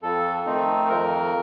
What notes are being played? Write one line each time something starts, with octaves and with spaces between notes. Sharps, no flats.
F2 A4
D#3 A3 C4 D#4
F2 A#4